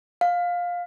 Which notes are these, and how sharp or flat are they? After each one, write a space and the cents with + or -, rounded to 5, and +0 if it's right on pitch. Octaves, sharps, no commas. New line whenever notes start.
F5 +15